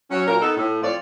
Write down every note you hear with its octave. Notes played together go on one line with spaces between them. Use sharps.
F#3 C#4
A#2 F#3 A#4
B3 D#4 A4
A2
F3 C4 F4 C#5 D5